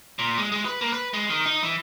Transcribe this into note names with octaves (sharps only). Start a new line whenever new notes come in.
A#2
G#3
G#3
B4
A#3
B4
G#3
D#3
D#4
E3